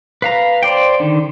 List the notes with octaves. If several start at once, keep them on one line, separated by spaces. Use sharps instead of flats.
B4 F5 A#5
C5 D5 G5
D3 D#3